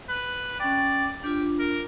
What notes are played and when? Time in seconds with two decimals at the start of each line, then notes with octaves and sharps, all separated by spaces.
0.09 B4
0.60 C#4 D5 G5
1.23 D4 F4 G4
1.59 A#4